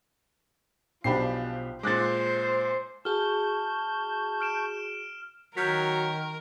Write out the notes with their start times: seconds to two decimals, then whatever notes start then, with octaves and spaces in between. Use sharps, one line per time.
1.04 B1 F3 D4 G4 C5 B5 C7
1.83 A#2 G#3 C5 D6 F#6 A6
3.05 F#4 G#4 A5 C#6 F6 G6 G7
4.41 F6 D7 E7
5.57 D#3 F#3 A#4 F6 G6 B6